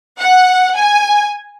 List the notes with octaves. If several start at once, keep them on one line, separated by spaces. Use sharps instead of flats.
F#5
G#5